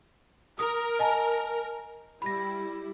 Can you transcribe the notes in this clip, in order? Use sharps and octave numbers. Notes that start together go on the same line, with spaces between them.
A#4 D#6
D#5 G#5 A5
G3 E4 B5 A#6